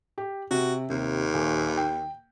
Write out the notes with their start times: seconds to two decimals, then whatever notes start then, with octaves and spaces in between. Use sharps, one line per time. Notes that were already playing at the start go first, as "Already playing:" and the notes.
0.18 G4
0.51 C3 F#4
0.90 D#2 C3
1.34 D#1
1.77 G5